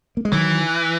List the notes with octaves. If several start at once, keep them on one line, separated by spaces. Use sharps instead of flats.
A#3
G#3
D#3 E3 F#3